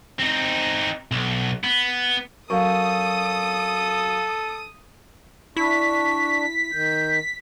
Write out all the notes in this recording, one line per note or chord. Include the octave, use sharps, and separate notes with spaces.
C4 D#4
B1
B3
F#2 A4 F5 C#6 D#6
D4 E4 C#6 B6
D#3 G6